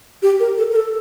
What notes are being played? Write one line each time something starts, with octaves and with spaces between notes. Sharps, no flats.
G4
A#4
A4
A#4
A4